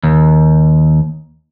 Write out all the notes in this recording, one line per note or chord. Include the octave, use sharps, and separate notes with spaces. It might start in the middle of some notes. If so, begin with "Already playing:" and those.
D#2